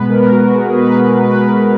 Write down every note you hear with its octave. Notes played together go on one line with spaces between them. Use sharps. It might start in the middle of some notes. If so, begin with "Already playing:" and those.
Already playing: B2 G#3 B3 B4
A#4
F#4
G#4
B4
B4